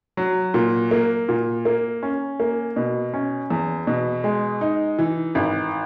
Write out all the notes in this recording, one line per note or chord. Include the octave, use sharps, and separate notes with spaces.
F#3
A#2
A#3
A#2
A#3
C#4
A#3
B2
C#4
E2
B2
G#3
D#4
E3
G#1